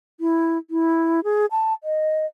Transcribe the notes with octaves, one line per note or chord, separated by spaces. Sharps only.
E4
E4
G#4
A5
D#5